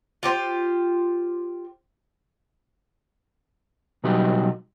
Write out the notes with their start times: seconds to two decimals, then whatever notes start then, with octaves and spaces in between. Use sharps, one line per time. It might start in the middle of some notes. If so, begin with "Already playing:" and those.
0.23 F4 G4 C5
4.04 B2 F#3 G3 D#4 F#4 G4